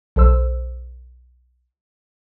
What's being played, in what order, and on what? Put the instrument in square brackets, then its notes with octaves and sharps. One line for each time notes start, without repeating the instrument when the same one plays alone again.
[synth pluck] B1 A4 C5 E6